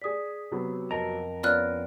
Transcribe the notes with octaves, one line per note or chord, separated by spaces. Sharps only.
G#4 D5 D#6 B6
C3 F#3 B3
F2 A#4 D#5 A5 A#5
B3 C#4 F4 D5 F6 F#6